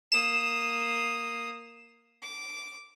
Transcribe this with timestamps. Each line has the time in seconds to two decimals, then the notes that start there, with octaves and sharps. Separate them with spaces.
0.12 A#3 D#6 E7
2.22 D6